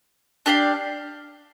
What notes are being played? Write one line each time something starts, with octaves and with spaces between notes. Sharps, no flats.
D4 G4 D5 F5